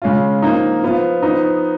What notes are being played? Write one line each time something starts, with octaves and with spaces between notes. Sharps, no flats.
C#3 G#3 C#4 F4
F3 A#3 D#4
F3 B3 F4
F3 B3 D#4